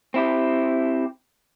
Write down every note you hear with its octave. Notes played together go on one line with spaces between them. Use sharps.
C4 E4 G4